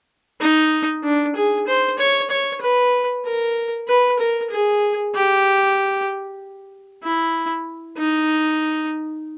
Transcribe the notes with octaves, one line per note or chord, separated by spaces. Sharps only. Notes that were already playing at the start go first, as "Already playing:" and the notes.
D#4
D4
G#4
C5
C#5
C#5
B4
A#4
B4
A#4
G#4
G4
E4
D#4